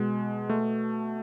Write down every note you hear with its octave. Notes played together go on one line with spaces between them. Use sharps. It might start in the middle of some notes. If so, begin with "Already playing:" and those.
Already playing: B2 G#3
A3